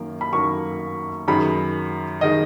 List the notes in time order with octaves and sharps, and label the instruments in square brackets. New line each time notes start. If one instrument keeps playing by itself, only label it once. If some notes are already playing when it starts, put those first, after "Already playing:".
Already playing: [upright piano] F#2 D#3 A#3
B5
F#2 D#3 A#3 C#6
F#2 D#3 G#3 B5
D#3 G#3 D#5